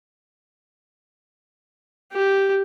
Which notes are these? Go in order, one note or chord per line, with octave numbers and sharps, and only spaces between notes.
G4